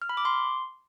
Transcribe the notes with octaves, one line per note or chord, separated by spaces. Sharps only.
F6
B5
D6
C6